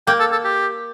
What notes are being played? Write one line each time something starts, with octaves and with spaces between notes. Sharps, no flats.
A#3 G5
A4
A4
G4